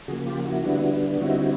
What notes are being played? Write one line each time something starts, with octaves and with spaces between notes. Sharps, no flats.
C#3 F3 A#3 F#4 G#4
F4 G4
E4 F#4
D3 G3 B3 D4
D3 G3 C4 D#4 E4 F#4